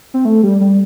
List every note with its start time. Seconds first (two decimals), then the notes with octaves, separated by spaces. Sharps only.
0.14 C4
0.25 A3
0.43 G3
0.61 G3